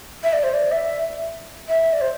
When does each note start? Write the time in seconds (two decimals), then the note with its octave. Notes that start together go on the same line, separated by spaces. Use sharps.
0.24 E5
0.33 D5
0.43 C5
0.54 D5
0.72 E5
1.69 E5
1.93 D5
2.01 C5